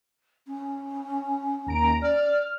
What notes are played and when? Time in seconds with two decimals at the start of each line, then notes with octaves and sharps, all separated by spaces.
0.47 C#4
1.67 D#2 A#5 D7
2.02 D5 F6